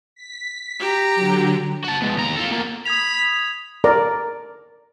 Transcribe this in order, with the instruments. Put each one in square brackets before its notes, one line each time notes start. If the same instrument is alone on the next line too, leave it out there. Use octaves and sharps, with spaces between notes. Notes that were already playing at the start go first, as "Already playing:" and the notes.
[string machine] B6
[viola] G4 A#5
[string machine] D3 F#3
[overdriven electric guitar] F#4 A5
G#3 B3
D#2 A#5
F4 A4
B2 A#3
[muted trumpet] B5 [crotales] D#6 G#6 F7
[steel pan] A#4 D5 A#5